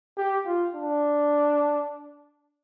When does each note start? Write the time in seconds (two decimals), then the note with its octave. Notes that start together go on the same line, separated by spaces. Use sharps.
0.17 G4
0.46 F4
0.75 D4